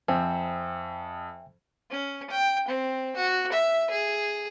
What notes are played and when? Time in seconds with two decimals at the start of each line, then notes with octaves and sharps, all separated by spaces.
0.08 F2 C4 E5 G5 G#5
1.91 C#4
2.30 G5
2.68 C4
3.16 F#4
3.52 E5
3.90 G#4